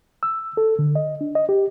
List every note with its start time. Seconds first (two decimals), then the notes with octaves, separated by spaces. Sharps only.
0.23 E6
0.57 A4
0.79 D3
0.95 D#5
1.21 D4
1.35 D#5
1.49 G4